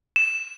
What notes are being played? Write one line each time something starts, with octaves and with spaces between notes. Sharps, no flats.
E7